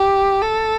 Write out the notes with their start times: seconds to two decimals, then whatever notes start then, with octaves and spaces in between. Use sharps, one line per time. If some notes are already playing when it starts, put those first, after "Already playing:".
Already playing: G4
0.42 A4